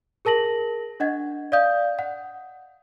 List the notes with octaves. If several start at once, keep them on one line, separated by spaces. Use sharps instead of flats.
G#4 A#4 A5 A#6 F#7
D4 D#5 F#5 G#6
D5 D#5 F5 D#6 G6
F#5